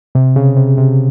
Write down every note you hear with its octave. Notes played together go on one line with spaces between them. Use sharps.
C3
C#3
C3
C3